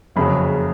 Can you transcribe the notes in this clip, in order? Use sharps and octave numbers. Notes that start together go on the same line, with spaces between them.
F#1 F2 C#3 F#3 B5